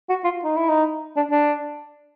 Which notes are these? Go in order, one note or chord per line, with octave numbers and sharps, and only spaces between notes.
F#4
F4
D#4
E4
D#4
D4
D4